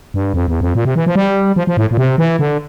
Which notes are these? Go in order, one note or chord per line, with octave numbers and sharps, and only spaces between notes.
G2
F2
E2
F2
A#2
C3
E3
F3
G3
F3
F3
A2
A#2
C3
E3
D3